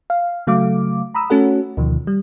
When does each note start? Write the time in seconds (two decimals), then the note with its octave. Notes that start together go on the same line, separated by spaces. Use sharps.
0.10 F5
0.47 C#3 F#3 A3 F5 D6
1.14 A#5 B5 D#6 E6
1.30 A3 C#4 F#4 A4 F#5
1.77 D2 B2 D#3 F3
2.07 G3